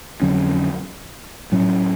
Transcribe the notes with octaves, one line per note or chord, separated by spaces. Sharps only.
F2 D3 F#3 C#4
A2 F#3 C#4